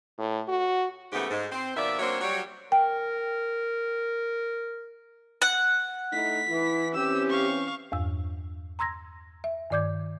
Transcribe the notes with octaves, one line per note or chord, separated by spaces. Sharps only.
A2
F#4
G#2 C#3 E3 A3 B3 G4
G#2
C4 C5
B2 D#3 F3 D5 E5
F#3 A#3 C4 D4 C5 C#5
F#3 G3 C#5
A#4 G5
F#5
A3 D#4 E4 B6
E3 E4
E3 C4 C#4 G4 E6
F5 C#6
E2 G2 E6
A#5 C6 E6 G#6 A#6
E5
G2 D#3 D5 D6 G6 G#6